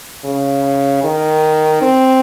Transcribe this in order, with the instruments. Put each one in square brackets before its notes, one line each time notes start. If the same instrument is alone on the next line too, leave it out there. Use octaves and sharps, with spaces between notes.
[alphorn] C#3
D#3
C4